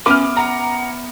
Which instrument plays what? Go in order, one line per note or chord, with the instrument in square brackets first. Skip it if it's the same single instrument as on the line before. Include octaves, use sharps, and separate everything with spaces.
[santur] B3 B4 E5 [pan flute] C#4 [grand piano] D6 F6
[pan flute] F#5 [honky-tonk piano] A#5